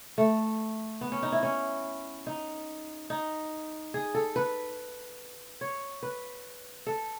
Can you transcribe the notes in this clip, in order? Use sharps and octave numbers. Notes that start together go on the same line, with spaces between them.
A3
B3
C#4
D#4
E4
C#4
D#4
D#4
G#4
A4
B4
C#5
B4
A4